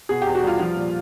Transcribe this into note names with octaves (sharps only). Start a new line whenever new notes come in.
B2 G#4
E2 G4
F#4
G3 F4
F3
A#2